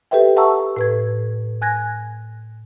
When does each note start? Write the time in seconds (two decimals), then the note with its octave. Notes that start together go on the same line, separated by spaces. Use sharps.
0.11 G4 A4 B4 C5 E5 G5
0.36 E5 F#5 A5 A#5 C#6 E6
0.76 A2 B4 G#6
1.62 G#5 F#6 G#6 A#6